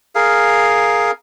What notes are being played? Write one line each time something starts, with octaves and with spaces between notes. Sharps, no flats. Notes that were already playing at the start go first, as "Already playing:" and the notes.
G#4 A#4 F5